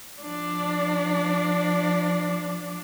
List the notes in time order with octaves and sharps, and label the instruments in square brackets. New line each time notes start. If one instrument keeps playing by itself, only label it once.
[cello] F3 D4